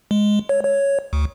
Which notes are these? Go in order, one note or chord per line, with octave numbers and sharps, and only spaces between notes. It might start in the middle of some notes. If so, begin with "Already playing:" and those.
G#3
C#5
C#5
D2